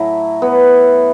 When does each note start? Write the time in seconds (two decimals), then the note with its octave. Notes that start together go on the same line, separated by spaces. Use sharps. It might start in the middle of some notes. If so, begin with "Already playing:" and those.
Already playing: A2 F#3 A3 E4
0.42 B3